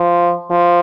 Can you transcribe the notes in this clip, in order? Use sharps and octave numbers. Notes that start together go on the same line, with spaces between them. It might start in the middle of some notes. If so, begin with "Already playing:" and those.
Already playing: F3
F3